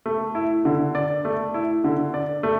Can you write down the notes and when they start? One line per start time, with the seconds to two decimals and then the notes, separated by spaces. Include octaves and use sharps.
0.06 A3
0.35 E4
0.65 D3
0.95 D5
1.25 A3
1.54 E4
1.84 D3
2.14 D5
2.43 A3